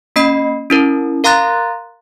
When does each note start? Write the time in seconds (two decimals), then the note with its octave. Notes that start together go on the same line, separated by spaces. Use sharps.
0.16 A#3 C#4 D#5 B5 C7
0.70 C#4 E4 A#4
1.24 A#4 F5 A#5 C6 F#6 A6